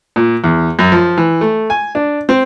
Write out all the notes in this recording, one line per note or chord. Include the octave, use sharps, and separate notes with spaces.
A#2
E2
F#2
F3
E3
A3
G#5
D4
C4